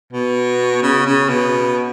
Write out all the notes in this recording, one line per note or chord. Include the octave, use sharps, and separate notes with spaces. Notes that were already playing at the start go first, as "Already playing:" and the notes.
B2
C#3
C#3
B2